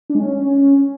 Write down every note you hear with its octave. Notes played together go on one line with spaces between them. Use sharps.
D4
G#3
C#4